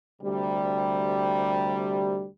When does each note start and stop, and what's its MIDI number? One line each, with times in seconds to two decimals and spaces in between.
0.21 2.25 38
0.21 2.25 48
0.21 2.25 55